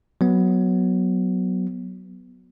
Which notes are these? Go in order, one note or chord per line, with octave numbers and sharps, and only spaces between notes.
F#3 B3